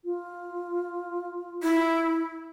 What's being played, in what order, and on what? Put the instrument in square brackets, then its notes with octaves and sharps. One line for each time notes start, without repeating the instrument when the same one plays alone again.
[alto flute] F4
[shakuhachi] E4